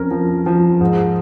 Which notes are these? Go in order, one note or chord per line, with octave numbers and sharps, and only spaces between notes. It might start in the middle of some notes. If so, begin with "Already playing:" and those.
Already playing: F2 C#4 A#4
F3
F3
G#2